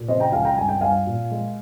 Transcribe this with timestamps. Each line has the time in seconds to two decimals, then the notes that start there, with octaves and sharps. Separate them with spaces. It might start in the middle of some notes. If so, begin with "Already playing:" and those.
Already playing: A#2
0.08 C#3 C5 D#5
0.20 G5 A#5
0.32 C#2 F5 G#5
0.45 G5 A#5
0.57 G2 G#5
0.69 G5
0.81 G2 F5 G#5
1.07 A#2
1.31 G#3